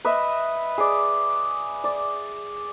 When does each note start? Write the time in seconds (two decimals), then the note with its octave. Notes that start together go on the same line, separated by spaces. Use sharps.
0.05 B4 D#5 E5
0.78 G#4 D5
1.84 D5